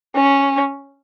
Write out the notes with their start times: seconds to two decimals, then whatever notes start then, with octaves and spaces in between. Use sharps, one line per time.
0.16 C#4